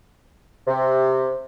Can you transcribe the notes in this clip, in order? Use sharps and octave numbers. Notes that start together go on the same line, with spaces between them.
C3